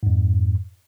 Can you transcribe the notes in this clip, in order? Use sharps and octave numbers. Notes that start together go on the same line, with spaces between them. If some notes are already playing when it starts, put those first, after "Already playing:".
F2 G#2